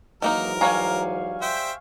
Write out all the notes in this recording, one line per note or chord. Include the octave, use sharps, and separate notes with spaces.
G#2 D#3 E3 F#3 A#3 D#4 A#4
G3 C#5 F5 G#5 A#5 C#6
C5 E5 G5